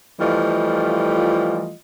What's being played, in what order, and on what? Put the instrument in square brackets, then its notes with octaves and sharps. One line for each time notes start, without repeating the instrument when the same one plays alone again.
[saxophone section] E3 F3 G3 A3 F4 D#5